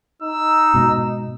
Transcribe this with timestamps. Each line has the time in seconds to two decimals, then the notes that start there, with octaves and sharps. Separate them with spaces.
0.22 D#4 E6
0.74 G#2 B2